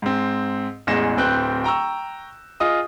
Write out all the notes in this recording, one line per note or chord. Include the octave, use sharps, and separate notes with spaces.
G#2 C4
A1 E2 G#3 A#6 E7
D1 C4 B4 G5 F#6 G6
G5 A#5 C#6 E6
F4 G#4 D#5 D#6